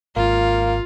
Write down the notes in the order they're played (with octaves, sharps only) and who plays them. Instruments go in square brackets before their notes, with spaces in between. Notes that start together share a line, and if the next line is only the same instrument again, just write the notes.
[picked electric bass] G#1 [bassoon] A#3 [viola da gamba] F4